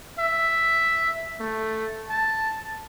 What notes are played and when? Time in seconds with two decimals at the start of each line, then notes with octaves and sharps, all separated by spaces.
0.19 E5
1.40 A3
2.09 A5